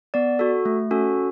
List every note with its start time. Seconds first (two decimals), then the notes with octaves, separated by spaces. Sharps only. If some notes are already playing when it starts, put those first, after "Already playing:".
0.14 B3 D5
0.39 F#4 A4
0.65 A3
0.91 C#4 F#4 A4